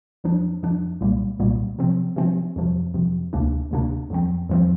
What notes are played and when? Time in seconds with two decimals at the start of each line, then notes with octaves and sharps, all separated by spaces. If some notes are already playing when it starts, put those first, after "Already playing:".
0.24 F2 F3 D4
0.63 F2 F3 D4
1.01 C2 A#2 G3 A#3
1.39 C2 A#2 G3 A#3
1.79 C3 F3 C4
2.16 C3 F3 C4
2.56 F2 C3 F3
2.94 F2 C3 F3
3.33 D2 C3 A#3 D4
3.71 D2 C3 A#3 D4
4.10 F2 F3 C4
4.49 F2 F3 C4